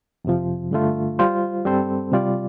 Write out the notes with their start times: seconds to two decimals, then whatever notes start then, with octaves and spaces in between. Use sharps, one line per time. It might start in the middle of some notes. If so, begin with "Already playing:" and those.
0.25 F2 C3 F3
0.71 G2 D3 A3 F4
1.19 G3 F4 C5
1.65 G2 G3 C4 A4 C5
2.12 C3 G3 F4 D5